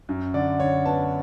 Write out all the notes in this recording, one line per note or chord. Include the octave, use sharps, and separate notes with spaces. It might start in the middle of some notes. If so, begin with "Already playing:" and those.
F#2
D3 D5
D3 C#5
B3 A5